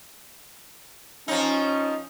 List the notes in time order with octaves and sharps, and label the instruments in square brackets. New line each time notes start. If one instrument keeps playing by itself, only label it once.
[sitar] F3 D#4 [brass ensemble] C#4